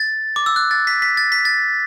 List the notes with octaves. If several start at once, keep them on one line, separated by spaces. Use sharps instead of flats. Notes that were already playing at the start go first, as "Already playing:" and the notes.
Already playing: A6
D6
E6
F#6
A6
B6
B6
A6
B6
A6